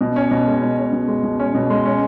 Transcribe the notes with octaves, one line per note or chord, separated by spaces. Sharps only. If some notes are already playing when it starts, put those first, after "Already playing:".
B2
C#4
B2
G#3
B2
C#4
B2
G#3
B2
C#4
B2
G#3
C#4